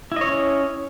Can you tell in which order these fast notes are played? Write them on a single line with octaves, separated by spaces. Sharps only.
E4 D#5 C#5 C#4